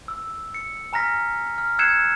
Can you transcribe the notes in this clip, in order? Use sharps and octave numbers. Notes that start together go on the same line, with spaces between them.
E6
C#7
G#5 A#5 F6 A#6 B6
F6
E6 F#6 G#6 C7 C#7 E7